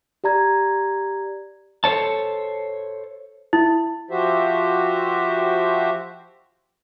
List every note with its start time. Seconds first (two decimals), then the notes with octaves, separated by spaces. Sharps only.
0.24 G4 D5 A#5 G#6
1.84 A4 C5 C#5 A5
3.53 E4
4.11 F3 F#4 G4 C5 E5